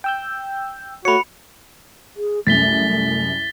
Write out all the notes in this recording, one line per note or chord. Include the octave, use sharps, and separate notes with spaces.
G5 E6 G6
A3 F#4 C#5 B5 C#7
G#4
C2 F#2 A3 A6 B6 G7